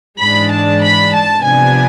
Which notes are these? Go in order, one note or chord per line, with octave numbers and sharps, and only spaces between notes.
G#2 E3 G#3 D4 B5
A5
B5
A5
C3 F3 B3 D4 G#5